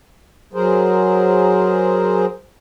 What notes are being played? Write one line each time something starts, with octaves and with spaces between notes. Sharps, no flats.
F#3 G#4 A#4 C5